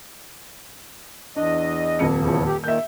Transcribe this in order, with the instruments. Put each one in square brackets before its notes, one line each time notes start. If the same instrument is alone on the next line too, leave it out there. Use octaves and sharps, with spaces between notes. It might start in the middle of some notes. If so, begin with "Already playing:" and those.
[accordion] E2 D#5 [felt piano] D4
[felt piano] D#1 F2 C#7
[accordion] E2 C#3 F3
G4
[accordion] A#2 D#3 [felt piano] E5 G6